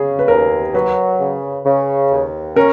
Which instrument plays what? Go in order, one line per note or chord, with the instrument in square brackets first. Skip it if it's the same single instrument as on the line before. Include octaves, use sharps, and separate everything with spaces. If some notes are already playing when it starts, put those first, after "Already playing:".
Already playing: [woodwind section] C#3 [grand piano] G#4
[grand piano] B4
[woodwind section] D#2 [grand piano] A#4
[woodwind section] F#3 [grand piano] B4
[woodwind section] C#3
C#3
D#2
[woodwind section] C#4 [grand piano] A#4